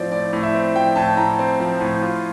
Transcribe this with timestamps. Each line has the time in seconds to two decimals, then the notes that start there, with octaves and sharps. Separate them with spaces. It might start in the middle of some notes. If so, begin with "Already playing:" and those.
Already playing: A2 F3 C4 D5
0.12 A2 D5
0.33 A2
0.43 E5
0.54 C4
0.75 F3 G5
0.96 A2 A5
1.17 A2 A#5
1.39 C4
1.60 F3
1.81 A2
2.02 F4